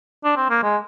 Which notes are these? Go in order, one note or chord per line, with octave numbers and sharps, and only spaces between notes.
D4
C4
A#3
G#3